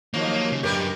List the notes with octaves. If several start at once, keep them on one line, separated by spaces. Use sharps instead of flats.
D#2 F3 F#3 A#3
C#3
F#2 D4 G4 A#4 B4